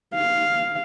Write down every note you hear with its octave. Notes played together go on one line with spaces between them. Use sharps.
F5